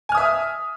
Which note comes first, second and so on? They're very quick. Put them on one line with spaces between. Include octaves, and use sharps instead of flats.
G#5 F6 D#6 E5